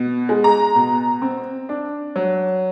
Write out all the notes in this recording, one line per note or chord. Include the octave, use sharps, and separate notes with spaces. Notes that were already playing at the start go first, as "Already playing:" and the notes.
Already playing: B2
G#3
A#5
B2
C4
D4
F#3